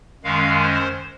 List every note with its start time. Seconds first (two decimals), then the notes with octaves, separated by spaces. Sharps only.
0.24 F#2 D#3 G#3 C#4 F5
0.62 C5